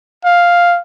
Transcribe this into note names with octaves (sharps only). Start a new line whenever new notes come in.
F5